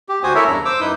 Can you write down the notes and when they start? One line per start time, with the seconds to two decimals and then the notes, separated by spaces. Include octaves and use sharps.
0.09 G4
0.23 D2 F#4 C5 G#5 D#6
0.35 E4 A4 A#4 C#5 E5
0.48 E2 G2 C#3 D4 A#5
0.65 C5 D6 E6
0.80 F#2 D#4 E4 B4 D#6 G6